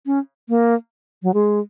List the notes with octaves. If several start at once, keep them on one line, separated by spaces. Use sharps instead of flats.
C#4
A#3
F#3
G#3